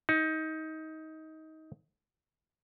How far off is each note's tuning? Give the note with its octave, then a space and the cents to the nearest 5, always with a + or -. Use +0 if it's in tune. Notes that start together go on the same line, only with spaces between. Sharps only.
D#4 +20